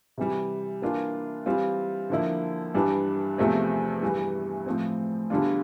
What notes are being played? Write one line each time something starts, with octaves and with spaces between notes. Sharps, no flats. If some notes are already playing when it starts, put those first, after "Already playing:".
C3 E3 G3
E3 A#3 D4 F4
E3 G3 C4 F4
D3 F3 A#3 E4
G2 E3 G3 D4
E2 C3 F3 A3 C4
G2 E3 G3
A2 F3 C4
E2 D3 G3 D4 F4